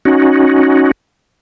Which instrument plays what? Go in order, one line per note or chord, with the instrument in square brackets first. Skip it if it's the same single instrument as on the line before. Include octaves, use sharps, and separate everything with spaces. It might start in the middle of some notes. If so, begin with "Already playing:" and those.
[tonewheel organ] C#4 D#4 F#4